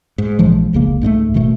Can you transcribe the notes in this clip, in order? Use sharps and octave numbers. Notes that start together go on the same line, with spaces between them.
G#2
A#1 E3 F3 G#3
F1 C#2 C#3 A#3
C#2 G#2 G#3 A3
E1 B2 D#3 A3